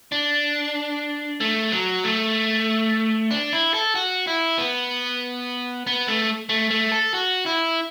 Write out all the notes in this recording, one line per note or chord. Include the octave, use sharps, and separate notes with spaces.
D4
A3
F#3
A3
D4
E4
A4
F#4
E4
B3
B3
A3
A3
A3
A4
F#4
E4